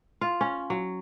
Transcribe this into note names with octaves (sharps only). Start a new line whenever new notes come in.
F4
C#4
F#3